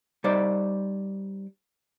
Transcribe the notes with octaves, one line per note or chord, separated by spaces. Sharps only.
G3 D#4 C5 D5